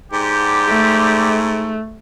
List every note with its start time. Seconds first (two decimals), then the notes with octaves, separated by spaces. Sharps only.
0.13 G#2 D3 G4
0.70 A3